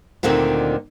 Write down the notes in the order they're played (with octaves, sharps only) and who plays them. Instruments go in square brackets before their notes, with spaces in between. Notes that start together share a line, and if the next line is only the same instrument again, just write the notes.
[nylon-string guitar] D2 A#2 D3 D#3 C4